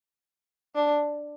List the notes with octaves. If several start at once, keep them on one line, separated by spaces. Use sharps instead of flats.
D4